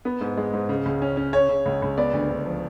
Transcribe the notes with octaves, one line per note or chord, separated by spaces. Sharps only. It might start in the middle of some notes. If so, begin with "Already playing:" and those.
B3
G#2
G#3
G#2
C#3
C#2
C#4
C#4
C#3 C#5
C#3
C#2
C#2
B3 D5
D2
D2
F3